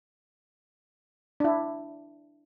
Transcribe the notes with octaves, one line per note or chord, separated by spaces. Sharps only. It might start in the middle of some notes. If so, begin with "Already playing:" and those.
D4 E4